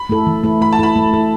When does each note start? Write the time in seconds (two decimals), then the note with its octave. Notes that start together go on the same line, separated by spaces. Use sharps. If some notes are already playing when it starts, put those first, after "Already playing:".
Already playing: B5
0.09 A3 E4 A4
0.27 E3
0.43 A3 E4 A4
0.61 A3 B5
0.73 A5
0.79 E4 A4 B5
0.96 A3
1.13 E4 A4